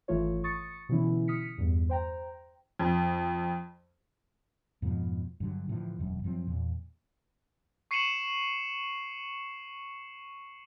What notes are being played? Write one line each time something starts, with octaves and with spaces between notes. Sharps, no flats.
G#1 E3 A3 F4 C#5
C#6 D#6 A6 C#7
B2 D3 E3 C#4 E4
D#6 F6 B6 C#7
E2 G2
C5 G5 A#5
F2
F2 G#2 B2 F3
G2 D3 F#3
A2 D3 E3 F3
E1 F#2
F#2 F3 G#3 C4
E2 A#2
C#6 C7 C#7 D#7 E7 F#7